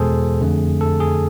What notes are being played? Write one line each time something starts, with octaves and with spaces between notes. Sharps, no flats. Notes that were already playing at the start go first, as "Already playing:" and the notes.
Already playing: E2 B2 G#3 G#4 A4 C5
F2 D3 A3
A4
G#4